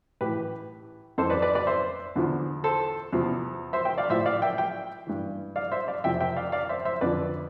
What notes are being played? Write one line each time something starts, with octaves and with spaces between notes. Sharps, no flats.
A2 E3 G4 B4
F2 E3 A4 C5
B4 D5
B4 D5
B4 D5
C5 E5
E2 D3 F3
A4 C5
E2 C3 F3
C5 E5
E5 G5
D5 F5
A2 F3 C5 E5
D5 F5
E5 G5
E5 G5
G2 E3
D5 F5
C5 E5
D5 F5
F2 C3 F3 E5 G5
E5 G5
D5 F5
D5 F5
C5 E5
C5 E5
F2 D3 F3 B4 D5